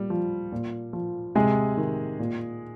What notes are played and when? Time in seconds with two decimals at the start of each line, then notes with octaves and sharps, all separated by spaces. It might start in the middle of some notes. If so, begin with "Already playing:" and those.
Already playing: A#2 G3
0.10 F3
0.52 A#2
0.93 F3
1.35 C3 G#3 G#4
1.77 D#3
2.19 A#2